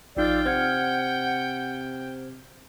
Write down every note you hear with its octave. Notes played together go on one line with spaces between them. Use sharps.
A1 F3 D#4 F4 D5 G5 E6
C3 C5 F#5 F6 G#6